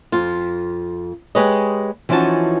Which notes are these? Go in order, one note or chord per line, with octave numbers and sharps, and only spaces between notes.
F2 F4
G#3 G4 G#4 B4 C#5 D#5
E3 F3 C#4 D#4 F#4 A5